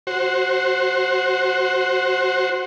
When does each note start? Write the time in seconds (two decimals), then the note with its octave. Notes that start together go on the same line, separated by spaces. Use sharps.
0.07 F#4 C5